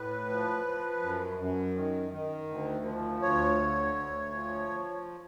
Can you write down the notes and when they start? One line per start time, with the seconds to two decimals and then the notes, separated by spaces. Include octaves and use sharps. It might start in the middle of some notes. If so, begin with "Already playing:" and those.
Already playing: A2 B4
0.29 F3
0.66 F3
1.02 F#2
1.39 F#2
1.76 D#3
2.12 D#3
2.49 D2
2.85 F3
3.22 D2 C#5
3.58 D3
3.95 D2
4.32 F3